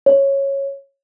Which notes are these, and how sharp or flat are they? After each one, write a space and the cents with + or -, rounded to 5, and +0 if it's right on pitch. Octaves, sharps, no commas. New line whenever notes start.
C#5 -10